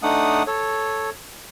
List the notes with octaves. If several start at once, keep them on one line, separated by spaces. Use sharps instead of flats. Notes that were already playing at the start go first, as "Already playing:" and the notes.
A3 D4 D#4 F#5 D#6
A4 C#5